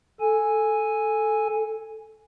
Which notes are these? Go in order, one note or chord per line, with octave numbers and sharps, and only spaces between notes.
A4 G#5